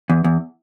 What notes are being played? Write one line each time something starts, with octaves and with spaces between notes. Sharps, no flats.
E2
E2